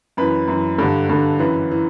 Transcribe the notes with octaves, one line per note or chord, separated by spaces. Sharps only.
F#2 E3 B4
F#2 E3
G2 D3 A4
G2 D3
F#2 E3 B4
E3